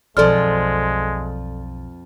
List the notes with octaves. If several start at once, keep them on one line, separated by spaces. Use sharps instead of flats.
B1 F2 G#3 F4 A4 D5 F6